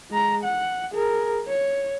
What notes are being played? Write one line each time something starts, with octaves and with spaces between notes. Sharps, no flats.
G#3 A#5
F#5
G#4 A#4
C#5